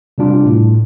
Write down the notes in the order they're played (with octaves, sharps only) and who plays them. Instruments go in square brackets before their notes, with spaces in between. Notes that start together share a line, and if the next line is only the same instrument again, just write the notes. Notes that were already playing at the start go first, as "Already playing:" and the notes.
[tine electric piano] C3 G3 D4 F4
A2